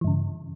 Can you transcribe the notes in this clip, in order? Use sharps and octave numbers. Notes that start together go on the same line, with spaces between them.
G2 C#3 E3